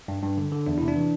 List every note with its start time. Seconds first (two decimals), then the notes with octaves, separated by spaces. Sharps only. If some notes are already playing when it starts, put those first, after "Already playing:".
0.08 G2
0.23 G2
0.38 D3
0.52 D3
0.66 E2 D4
0.78 C3 E4
0.88 D4
0.96 E3